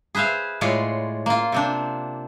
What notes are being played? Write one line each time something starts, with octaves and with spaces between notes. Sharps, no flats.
G#4 B4 C5 E5 F5
A2 G#3 F4 C#5 D5
A#3 F4
C3 C4 D4